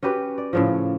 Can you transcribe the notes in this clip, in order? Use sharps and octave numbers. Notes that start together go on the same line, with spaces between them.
C#4 F#4 G4 B4
D5
A2 C#3 F3